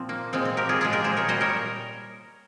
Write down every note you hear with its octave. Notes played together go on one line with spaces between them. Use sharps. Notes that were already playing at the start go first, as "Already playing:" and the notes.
Already playing: A#2 F3 C4
A#3
A#2 F3 G#3 C4
C4
G4 A#4
F4 G#4
A#2 F3 G#3 F4 G#4
G4 A#4
G#4 C5
A#4 C#5
A#2 G3 C5 D#5
A#4 C#5